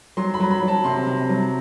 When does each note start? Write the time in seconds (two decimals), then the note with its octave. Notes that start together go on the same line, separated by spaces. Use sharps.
0.17 F#3 C6
0.34 B5
0.40 F#3
0.51 B5
0.63 F#3
0.68 A5
0.84 C3 C6
1.07 C3
1.29 F#3